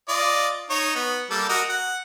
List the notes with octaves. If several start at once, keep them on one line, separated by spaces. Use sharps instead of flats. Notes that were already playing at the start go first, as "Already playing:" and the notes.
F4 D5 D#5
D#4 C#5
B3
G3 A#3 A4
F#4 A#4 D#5
F#5